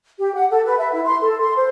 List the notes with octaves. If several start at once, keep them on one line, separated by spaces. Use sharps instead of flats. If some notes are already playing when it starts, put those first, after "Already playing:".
G4
F#5
A4
B4
E5
E4
C6
A4
C6
C5